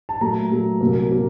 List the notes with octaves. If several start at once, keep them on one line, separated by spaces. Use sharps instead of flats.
A5
A#2 F#3 A3 A#5
A#2 F#3 A3
C2 A#2 F#3 A#3
A#2 F#3 A#3